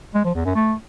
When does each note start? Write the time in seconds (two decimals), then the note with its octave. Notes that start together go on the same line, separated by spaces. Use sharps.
0.14 G#3
0.24 F3
0.35 E2
0.45 F#2
0.55 A3